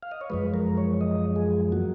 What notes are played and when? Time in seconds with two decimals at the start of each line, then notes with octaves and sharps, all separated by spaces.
0.03 F5
0.11 D#5
0.21 C#5
0.30 F#2 F3 G#3 B4
0.54 A#4
0.77 C#5
1.01 D#5
1.36 G#4
1.72 F#3 A#3 F#4